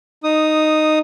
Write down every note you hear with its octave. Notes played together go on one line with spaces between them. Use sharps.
D#4 D#6